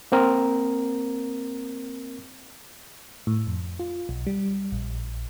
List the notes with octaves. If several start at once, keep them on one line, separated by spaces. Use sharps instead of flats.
A#3 C4 A#4
A2
F2
F4
B1
G3
A#1